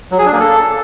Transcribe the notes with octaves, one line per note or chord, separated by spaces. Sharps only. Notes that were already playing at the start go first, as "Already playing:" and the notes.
F#3
G#4
D4
A#3
A4